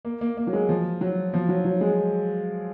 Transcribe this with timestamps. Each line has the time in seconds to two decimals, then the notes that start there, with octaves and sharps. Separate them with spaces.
0.05 A#3
0.21 A#3
0.37 A#3
0.47 F#3
0.53 G#3
0.69 F3
1.01 F#3
1.34 F3
1.49 F#3
1.65 F#3
1.81 G#3